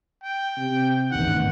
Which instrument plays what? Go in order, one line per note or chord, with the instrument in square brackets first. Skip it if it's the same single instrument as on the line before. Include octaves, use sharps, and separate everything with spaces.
[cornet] G5
[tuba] C3
[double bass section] A1 E2 G2 [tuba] D#3 [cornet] F#5